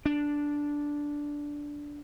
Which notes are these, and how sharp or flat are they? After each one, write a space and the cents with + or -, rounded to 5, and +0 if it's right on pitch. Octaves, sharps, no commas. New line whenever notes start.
D4 -5